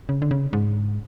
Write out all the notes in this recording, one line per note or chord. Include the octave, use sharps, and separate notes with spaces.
C#3
D3
C#3
G#2